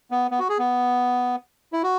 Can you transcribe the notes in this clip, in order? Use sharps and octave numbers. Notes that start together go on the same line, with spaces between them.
B3
B3
F#4
G#4
B3
E4
F#4